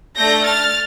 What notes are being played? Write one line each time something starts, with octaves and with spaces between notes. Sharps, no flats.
A3 D4 A4 G6 A#6
F6 A6